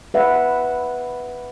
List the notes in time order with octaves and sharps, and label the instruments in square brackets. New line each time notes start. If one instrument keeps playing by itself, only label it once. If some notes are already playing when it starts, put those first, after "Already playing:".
[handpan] B4 E5 F#5